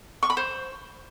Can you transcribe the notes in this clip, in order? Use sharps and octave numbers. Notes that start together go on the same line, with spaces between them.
C#6
B5
C5